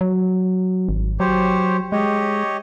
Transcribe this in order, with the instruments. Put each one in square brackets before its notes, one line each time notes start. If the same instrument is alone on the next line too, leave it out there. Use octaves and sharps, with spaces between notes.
[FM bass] F#3
G#1
[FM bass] F#3 [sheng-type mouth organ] G4 C5 C#5
[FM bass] G#3 [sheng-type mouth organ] G4 C#5 D#5